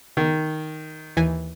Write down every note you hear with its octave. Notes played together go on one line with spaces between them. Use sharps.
D#3
D#2 E3 G#5